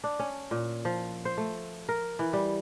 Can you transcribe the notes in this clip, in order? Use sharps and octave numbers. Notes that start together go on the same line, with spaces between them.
D4
C#4
A#2
F3
C5
A3
A#4
E3
G3